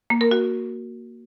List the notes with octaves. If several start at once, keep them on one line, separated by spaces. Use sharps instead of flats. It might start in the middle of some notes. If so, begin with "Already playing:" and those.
A#3
A#4
F#4